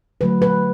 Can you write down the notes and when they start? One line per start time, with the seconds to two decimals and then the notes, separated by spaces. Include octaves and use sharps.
0.21 D3 F#3 A3 B4
0.42 B4